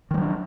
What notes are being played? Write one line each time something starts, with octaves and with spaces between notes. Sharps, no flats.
D#3 F#3 G3 D4